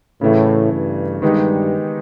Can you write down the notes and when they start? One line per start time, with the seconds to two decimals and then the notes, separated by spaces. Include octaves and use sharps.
0.21 A2 C#3 E3 A3
0.72 G2
1.22 G2 D#3 G#3 B3 D#4 G4